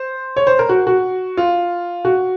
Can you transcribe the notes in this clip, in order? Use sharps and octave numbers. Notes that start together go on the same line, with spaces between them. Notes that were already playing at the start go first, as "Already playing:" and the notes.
Already playing: C5
C#5
C5
A#4
F#4
F#4
F4
F#4